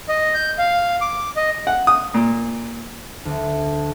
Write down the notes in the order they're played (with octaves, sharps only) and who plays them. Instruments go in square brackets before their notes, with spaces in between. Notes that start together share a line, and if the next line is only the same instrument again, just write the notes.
[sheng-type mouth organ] D#5
G6
F5
D6
D#5
[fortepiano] F#5
D#6
A#2
[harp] D2